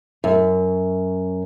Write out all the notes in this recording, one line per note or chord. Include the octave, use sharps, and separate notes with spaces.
F#2